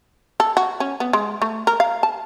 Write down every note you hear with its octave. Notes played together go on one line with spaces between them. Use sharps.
A4
F#4
C#4
B3
G#3
A3
A#4
F5
A5